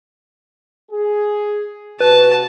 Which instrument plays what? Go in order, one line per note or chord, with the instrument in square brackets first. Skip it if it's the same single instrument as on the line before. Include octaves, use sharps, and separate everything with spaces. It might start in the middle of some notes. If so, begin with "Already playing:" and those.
[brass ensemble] G#4
[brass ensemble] C3 F#4 [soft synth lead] B4 [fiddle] A5